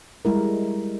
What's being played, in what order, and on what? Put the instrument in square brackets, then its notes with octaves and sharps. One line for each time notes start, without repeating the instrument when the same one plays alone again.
[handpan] G3 G#3 E4 A#4